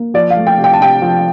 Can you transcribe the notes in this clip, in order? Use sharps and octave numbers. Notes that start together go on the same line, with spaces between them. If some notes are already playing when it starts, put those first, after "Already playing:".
Already playing: A#3
F3 D5
F5
A3
G5
C3
G5
A5
C3 G5
F3